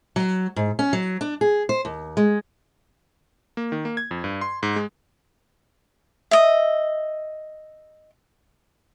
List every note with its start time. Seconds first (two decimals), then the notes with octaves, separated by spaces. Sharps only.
0.16 F#3
0.56 G#2
0.79 C#4
0.93 F#3
1.21 D4
1.41 G#4
1.69 C5
1.85 D#2
2.17 G#3
3.57 A#3
3.72 D#3
3.85 A#3
3.97 G#6
4.11 F2
4.24 G2
4.41 C6
4.63 G#2
4.76 G#3
6.31 D#5 E5